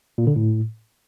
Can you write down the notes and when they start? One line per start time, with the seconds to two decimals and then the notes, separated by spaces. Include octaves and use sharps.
0.18 A#2
0.27 D3
0.36 A2